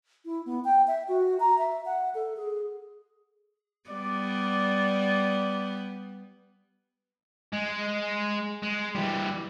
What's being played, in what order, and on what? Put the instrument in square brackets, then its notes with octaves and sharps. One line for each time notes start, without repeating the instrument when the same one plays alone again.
[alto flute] E4
B3
G5
E5
F#4
A#5
E5
F#5
A4
G#4
[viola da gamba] G3 B3 [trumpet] D5
[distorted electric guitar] G#3
G#3
E3 G3